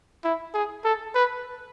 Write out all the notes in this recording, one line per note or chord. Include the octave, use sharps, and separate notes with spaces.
E4
G#4
A4
B4